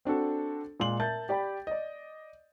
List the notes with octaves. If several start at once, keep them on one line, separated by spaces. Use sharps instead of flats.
C4 D4 F#4 A4
A#2 G#3 F5 C6 F#7
A#4 E5 A5 G6 A6
G4 D5 G5 B5
D5 D#5